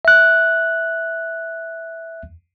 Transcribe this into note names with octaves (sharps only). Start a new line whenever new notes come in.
E5 F#6